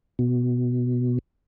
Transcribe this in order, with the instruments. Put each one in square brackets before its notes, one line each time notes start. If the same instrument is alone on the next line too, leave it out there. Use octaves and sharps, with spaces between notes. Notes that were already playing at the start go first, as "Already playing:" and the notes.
[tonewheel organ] B2